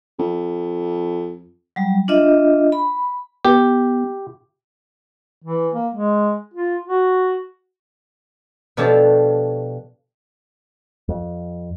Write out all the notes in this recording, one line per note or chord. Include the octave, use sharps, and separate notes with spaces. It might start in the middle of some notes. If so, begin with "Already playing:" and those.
F2
F#3 G3
D4 F4 D#5 E5
B5
B3 G4
E3
A#3
G#3
F4
F#4
B2 F3 D4 G4 A4 C#5
F2